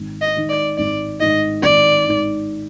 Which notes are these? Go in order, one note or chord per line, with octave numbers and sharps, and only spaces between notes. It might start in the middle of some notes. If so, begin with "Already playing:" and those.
Already playing: G#1
D#5
G#2 D#3
D5
G#1 D5
G#2 D#3 D#5
G#1 D5
G#2 D#3